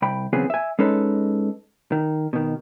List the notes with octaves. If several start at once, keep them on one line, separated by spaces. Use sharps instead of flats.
C2 G5 B5
C#3 E3 F#3 B3 C4 G#4
E5 G#5
G#3 C#4 D#4 A4 B4
D#3
B2 D#3